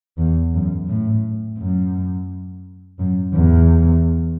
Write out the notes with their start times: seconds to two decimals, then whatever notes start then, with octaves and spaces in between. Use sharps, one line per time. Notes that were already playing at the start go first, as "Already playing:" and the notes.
0.18 E2
0.54 F#2
0.89 A2
1.59 F#2
2.99 F#2
3.34 E2